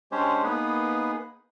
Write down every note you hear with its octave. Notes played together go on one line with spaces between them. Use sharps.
G#3 C#4 D4 G4 C5 C#5
A#3 B3 D#4 G#4 B4